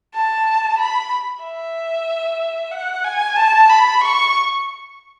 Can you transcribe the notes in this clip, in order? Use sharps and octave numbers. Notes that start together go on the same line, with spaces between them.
A5
B5
E5
F#5
G#5
A5
B5
C#6